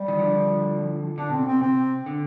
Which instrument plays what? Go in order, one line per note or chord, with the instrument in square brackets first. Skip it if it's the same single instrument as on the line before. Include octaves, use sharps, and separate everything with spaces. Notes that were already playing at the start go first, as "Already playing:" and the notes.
Already playing: [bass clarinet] G3
[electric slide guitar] D#3
D3 F3
[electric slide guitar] D3 [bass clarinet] D4
[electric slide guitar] B2
[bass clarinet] C4
[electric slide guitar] B2
[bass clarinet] C4
[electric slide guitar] C3 [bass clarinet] C4
[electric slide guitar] D3